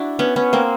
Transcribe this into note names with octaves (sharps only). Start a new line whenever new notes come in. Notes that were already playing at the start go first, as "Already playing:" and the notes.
Already playing: D4 E4 F#4
B3 C#4
B3 C#4
A#3 C4